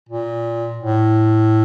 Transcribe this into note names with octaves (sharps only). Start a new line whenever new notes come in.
A#2
A2